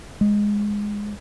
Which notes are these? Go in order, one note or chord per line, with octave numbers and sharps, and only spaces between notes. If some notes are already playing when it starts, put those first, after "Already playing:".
G#3